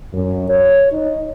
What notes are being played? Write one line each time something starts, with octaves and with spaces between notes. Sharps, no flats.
F#2
C#5
D#4